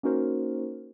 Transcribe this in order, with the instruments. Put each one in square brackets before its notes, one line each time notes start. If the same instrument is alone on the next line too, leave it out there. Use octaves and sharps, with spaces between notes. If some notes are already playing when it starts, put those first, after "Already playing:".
[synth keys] A#3 C#4 D#4 F#4 A#4 C5